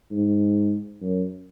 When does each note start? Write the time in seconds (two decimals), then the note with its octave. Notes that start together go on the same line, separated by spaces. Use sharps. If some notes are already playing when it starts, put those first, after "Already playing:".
0.12 G#2
1.01 F#2